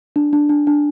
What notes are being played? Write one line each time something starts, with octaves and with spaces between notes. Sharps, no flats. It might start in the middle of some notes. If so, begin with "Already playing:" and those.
D4
D4
D4
D4